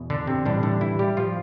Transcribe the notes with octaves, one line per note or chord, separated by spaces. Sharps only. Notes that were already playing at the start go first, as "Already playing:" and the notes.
Already playing: E2 B2
D3 D4
C3 C4
A2 D3 E3 G3 D4
D3 D4
E3 E4
G3 G4
F3 F4